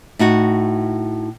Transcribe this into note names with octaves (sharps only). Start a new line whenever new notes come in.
A2 D#4 F#4